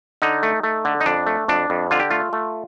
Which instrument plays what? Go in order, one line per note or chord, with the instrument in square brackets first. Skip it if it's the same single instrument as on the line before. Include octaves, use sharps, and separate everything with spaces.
[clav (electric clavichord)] D3 D#4
A3
A3
D3
D#4
F2 D4
A3
F2 D4
F2
D3 F4
G4
A3 F4
A3